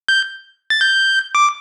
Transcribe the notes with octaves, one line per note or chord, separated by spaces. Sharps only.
G6
A6
G6
D6